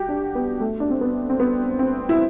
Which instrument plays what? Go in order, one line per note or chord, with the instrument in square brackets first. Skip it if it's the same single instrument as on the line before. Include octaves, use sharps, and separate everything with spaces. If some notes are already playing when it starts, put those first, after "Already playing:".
Already playing: [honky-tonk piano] F#4 G4
D4
B3
A3
D4
C4
B3
C4
B3
C4
E4